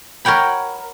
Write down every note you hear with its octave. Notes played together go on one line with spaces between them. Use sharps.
A#4 C#5 F#5 G5 B5